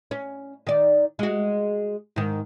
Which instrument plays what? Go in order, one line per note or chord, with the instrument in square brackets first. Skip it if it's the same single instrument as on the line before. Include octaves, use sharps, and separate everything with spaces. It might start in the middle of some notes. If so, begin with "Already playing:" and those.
[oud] C#4
D#3 D5
G#3 F#4
G#2 D#3